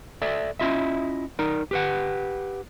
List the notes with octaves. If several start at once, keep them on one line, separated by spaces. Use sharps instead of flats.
A4 D5 E5
C#4 E4 F4 D#5 E5
D#4 A#4 D5
G4 B4 F#5